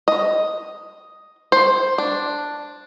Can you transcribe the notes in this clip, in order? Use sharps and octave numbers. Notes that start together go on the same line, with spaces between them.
D#5
C5
D4